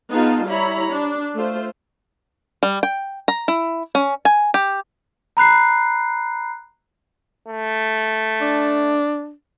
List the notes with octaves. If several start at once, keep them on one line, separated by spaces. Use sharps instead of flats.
B3 D#4 F4 G#4 A5
G3 E4 C#5 A#5 B5
D4
A3 F4 C5
G3
G5
A#5
E4
C#4
G#5
G4
A#5 B5 F#6 C7
A3
D4